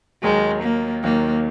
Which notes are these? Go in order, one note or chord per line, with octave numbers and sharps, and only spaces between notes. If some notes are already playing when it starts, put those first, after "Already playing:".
D#2 D#3 F#3 G#3
A#3
D#2 D#3 F#3 A#3